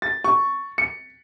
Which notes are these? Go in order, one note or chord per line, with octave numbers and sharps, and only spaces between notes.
A6
C#6
C#7